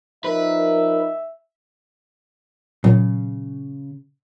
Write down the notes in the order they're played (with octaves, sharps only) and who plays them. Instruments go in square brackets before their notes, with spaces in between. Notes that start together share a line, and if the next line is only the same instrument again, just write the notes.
[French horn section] F3 D#4 A#4 [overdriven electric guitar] B4 [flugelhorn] E5
[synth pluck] A#2 F#3 [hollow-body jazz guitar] C#3